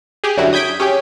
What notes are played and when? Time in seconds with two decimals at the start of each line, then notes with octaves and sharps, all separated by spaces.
0.24 G4 G#4
0.37 F#2 D3 F#3 G3 E4 F#4
0.53 D#6 G6 G#6 B6 D7
0.80 C#4 G4 G#4 G5